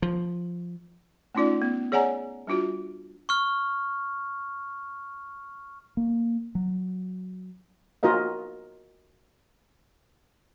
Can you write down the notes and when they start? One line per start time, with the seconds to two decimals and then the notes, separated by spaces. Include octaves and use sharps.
0.02 F3
1.35 A3 C#4 D#4 F4 D5
1.62 B3
1.92 G#4 C#5 D5 F#5 G#5 A#5
2.47 G3 D4 F4 F#4
3.29 C#6 F6
5.97 A#3
6.55 F#3
8.03 F4 F#4 A#4 D#5 F5